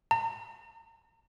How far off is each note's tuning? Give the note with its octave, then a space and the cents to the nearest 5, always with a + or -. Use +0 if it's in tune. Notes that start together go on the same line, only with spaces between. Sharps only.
A#5 -40